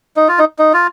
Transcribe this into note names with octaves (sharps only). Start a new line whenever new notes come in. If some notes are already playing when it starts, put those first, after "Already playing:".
D#4
F4
D#4
D#4
F4